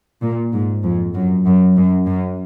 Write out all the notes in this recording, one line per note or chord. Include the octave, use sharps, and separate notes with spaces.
A#2
G#2
F2
F#2
F#2
F#2
F#2